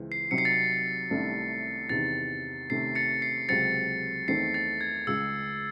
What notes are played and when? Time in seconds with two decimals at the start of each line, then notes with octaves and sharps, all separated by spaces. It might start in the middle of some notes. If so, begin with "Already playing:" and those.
Already playing: C#2 E3 C4
0.12 C7
0.31 C3 F#3 C4 D#4 C#7
0.38 C7
0.45 A6 C#7
1.10 C2 C3 D#3 A3 C#4
1.89 E2 C3 D#3 A6
2.70 C3 D#3 A3 C#4 C7
2.95 A6 C#7
3.22 C7
3.49 C#2 C3 F#3 C4 A6 C#7
4.28 E2 D#3 A3 C4 D#4 C7
4.54 A6
4.81 G#6
5.07 C#2 C#3 G#3 E6